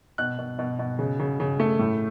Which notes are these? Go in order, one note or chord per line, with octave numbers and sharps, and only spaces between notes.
B2 F#6
B2
B2
B2
C#3
C#3
C#3
A3
A2